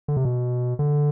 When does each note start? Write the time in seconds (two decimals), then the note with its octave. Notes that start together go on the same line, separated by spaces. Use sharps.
0.08 D3
0.17 C3
0.25 B2
0.79 D3